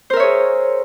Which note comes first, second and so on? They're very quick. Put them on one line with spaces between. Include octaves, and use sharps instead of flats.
C5 A#4 E5 C#5 G#4